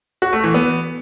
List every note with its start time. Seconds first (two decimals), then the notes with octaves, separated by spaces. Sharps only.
0.22 F#4
0.33 A3
0.44 E3
0.54 B3